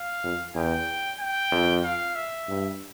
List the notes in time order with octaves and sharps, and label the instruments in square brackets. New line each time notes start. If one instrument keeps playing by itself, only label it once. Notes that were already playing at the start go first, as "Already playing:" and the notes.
Already playing: [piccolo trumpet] F5
[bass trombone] F2
[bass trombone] E2 [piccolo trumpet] G5
[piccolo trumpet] G5
[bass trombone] F2
[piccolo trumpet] F5
E5
[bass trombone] G2